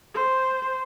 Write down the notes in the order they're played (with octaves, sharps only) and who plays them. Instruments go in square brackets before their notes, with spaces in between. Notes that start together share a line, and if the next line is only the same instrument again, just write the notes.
[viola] C5